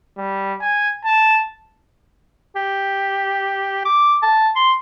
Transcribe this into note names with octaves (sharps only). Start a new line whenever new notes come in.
G3
G#5
A5
G4
D6
A5
C6